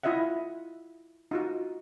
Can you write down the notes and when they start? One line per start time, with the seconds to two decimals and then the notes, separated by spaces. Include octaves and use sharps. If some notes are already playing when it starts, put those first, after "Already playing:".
0.03 E4 F4 D#5 E5 F#5
1.31 D#4 F4 F#4